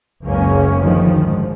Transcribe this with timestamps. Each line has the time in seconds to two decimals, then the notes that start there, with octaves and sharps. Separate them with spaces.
0.24 F#1 C#2 A#3 C#4
0.78 D2 D#3 F3
1.21 G#2